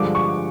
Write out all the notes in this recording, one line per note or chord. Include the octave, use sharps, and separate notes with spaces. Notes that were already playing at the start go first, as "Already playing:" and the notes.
Already playing: G2 D3 F3 G#3 D6
C#6